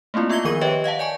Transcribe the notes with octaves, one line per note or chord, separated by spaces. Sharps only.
A3 A#3 C4 E4 F4
B3 F4 E6 G#6 A#6 G7
D#3 F3 B3 A#4 C#6 D#7
G4 B4 C#5 D#5 E5 G5
D#5 F5 F#5 A5
D5 G#5 A5 C#6